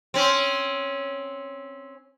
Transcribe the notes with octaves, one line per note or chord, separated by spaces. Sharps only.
C4 C#4